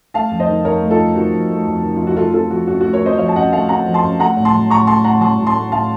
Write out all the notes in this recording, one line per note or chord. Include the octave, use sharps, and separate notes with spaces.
A3 F5 A5
F2
C5 D#5
D#3
F2 A#4 C#5
A3
F4 A4
F2
D#3 F#4
F2
A3
F2
D#3
F2 F4
F#4
A3 F4 A4
C4 F4 A4
F3 F#4
F#2 F#4
A3 F#4
A#4 C#5
C4 C5 D#5
F3 C#5 F5
A5
F#2 D#5 F#5
A3 F5 A5
C4 F#5 A#5
F3
A5 C6
F#2
A3 F#5 A#5
A2
A5 C6
F#3
A2 A#5 C#6
A3 A5 C6
A2 F#5 A#5
F#3 A5 C6
A2
A5 C6
A3
A2 F5 A5